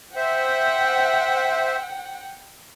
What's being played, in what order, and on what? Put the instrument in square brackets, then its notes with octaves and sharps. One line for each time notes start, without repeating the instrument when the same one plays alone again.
[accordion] C5 E5 [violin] F#5 G5